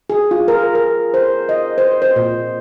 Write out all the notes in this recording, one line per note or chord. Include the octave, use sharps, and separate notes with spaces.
G#4
F4
A#4
A#4
C5
D#5
C5
C5
A#2